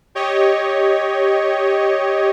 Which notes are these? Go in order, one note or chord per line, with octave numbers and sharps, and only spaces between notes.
G4 C#5 D#5